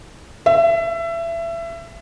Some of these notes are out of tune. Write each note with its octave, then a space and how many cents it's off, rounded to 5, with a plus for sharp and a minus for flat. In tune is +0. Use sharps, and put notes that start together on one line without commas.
E5 +25